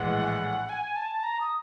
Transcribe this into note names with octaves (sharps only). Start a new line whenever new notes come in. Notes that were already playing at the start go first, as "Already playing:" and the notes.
Already playing: A#1 A2 E3 G#3 F#5
G#5
A5
A#5
D#6